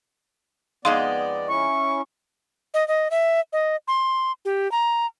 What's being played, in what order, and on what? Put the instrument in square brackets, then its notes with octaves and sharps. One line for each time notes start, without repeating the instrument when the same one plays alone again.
[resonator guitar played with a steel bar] F2 G#3 D#4 [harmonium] B3 D5 [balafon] F5 C6
[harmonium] C#4 E4 [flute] C#6
[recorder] D#5
D#5
E5
D#5
C6
G4
A#5